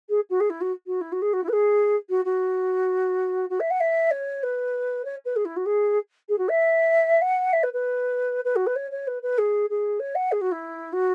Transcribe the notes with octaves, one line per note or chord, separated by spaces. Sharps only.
G#4
F#4
G#4
E4
F#4
F#4
E4
F#4
G#4
F#4
E4
B4
G#4
F#4
F#4
F#4
E5
F#5
E5
C#5
B4
C#5
B4
G#4
E4
F#4
G#4
G#4
F#4
E5
F#5
E5
B4
B4
B4
F#4
B4
C#5
C#5
B4
B4
G#4
G#4
C#5
F#5
G#4
F#4
E4
F#4